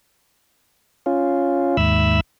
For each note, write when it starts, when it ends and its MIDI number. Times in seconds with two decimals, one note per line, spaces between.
1.06 1.77 61
1.06 1.77 65
1.77 2.20 39
1.77 2.20 44
1.77 2.20 76
1.77 2.20 83
1.77 2.20 88